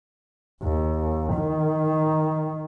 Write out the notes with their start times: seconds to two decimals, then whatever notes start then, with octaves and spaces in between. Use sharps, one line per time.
0.62 D#2
1.33 D#3